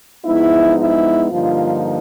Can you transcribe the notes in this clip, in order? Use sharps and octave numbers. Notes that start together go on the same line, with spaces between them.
G#2 F3 G#3 B3 D#4 E4
E4
G2 D3 F3 A#3 D#4 F4